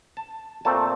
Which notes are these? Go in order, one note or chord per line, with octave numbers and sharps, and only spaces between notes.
A5
A#2 A3 C4 A5